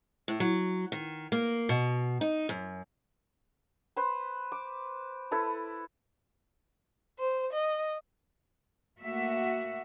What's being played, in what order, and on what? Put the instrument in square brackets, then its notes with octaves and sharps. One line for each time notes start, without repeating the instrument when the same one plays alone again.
[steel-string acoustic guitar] A2
F#3
D#3
A#3
B2
D#4
F#2
[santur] B4 C5 B5
D6
E4 A4 B4
[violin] C5
D#5
[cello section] A3 A#3 F#4 E5